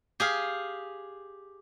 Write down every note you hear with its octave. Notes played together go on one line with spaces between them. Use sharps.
G4 G#4 F5